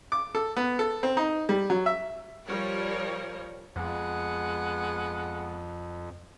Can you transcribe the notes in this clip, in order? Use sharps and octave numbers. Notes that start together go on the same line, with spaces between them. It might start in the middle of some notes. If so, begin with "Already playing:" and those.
D6
A4
B3
A4
C4
D#4
G3
F#3
E5
F3 G3 A#4 C#5
F2 G#3 B3 F#5